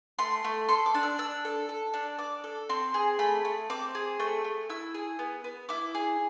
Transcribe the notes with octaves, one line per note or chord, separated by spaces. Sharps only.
A3 C6
A3
A4 C6
D6
D4
E6
D4 E6
A4
A4
D4
D4 D6
A4
C4 C6
G#4
A3 B5
A3
C4 D6
G#4
A3 E6
A3
E4 E6
G#4
B3
B3
E4 D6
G#4